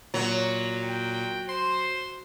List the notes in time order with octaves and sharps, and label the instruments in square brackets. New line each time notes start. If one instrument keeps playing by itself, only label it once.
[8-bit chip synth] A#2 [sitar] F#3
[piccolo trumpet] G5
[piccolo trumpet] C5 [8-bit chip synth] C6